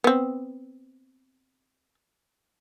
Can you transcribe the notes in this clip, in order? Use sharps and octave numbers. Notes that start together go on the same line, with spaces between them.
B3 C4